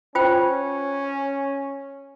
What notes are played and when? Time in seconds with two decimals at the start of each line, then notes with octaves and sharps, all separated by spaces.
0.15 C#4 F4 C5 G5